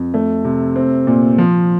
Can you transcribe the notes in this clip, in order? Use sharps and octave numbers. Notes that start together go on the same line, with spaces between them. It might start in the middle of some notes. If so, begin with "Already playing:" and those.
Already playing: F2
A3
C3
C4
A#2
F3